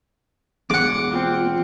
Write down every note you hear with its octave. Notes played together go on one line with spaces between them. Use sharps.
E2 B2 G#3 F#5 D6
A#3 C4 F4